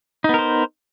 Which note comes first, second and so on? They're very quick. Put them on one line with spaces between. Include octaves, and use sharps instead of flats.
D#4 B3 A#4 C5